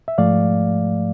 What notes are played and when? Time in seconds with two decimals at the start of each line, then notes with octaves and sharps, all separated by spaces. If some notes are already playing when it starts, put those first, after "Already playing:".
0.08 E5
0.18 G#2 F3 A3 D5 F5